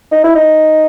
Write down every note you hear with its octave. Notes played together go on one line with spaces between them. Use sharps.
D#4
E4
D#4